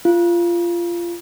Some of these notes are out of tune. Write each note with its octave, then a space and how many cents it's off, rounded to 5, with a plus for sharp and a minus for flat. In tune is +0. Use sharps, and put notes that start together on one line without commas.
F4 -20